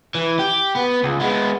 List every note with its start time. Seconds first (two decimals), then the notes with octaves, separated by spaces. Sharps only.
0.15 E3
0.39 G4
0.75 B3
1.03 C#2
1.20 G#3 B3